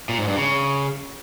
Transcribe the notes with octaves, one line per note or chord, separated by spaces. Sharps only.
A#2
G#2
G2
C#3